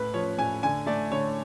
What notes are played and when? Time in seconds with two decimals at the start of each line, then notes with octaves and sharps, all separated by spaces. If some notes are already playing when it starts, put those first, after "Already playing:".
Already playing: A2 B4
0.14 F3 C#5
0.38 A2 G#5
0.63 D3 G#5
0.87 A3 D5
1.11 D3 C#5